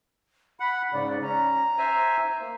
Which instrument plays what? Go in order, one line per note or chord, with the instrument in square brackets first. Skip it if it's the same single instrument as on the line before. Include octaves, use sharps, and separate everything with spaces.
[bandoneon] F#5 [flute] B5
[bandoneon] G#2 C#3 [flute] D5
[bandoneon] C#4 [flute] A#5
[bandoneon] C5 E5 G#5
A#3